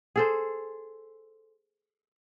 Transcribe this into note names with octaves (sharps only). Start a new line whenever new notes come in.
G#4 A4 C5